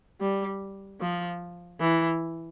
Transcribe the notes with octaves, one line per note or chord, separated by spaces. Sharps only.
G3
F3
E3